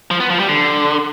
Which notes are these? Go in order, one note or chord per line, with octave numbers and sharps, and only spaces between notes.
F3
B3
F3
G3
D3